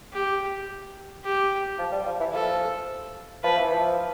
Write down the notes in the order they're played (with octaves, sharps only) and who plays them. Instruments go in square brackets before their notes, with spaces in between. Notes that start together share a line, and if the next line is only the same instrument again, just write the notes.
[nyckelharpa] G4
G4
[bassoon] F3
G3
F3
E3
[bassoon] F3 [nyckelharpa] A4
[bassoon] F3 [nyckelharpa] B4
[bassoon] E3
F3